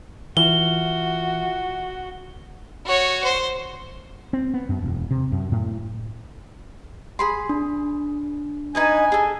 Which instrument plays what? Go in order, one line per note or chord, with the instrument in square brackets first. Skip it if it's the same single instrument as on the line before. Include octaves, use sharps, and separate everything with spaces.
[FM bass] E3 [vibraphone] F4 E5 [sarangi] F#4 [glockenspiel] G7
[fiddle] F#4 C#5
C5
[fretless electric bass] C4
B3
F#2
E1
C3
F#2
A2
[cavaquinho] G#4 B5 C6
[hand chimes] D4
[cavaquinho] D#4 B4 D#5 [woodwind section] G#5
[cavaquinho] G#4 A4